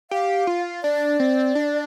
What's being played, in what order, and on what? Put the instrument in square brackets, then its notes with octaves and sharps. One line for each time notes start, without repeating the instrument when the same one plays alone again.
[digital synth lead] G4 [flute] F5
[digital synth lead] F4
[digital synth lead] D4 [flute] D5
[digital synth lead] C4
D4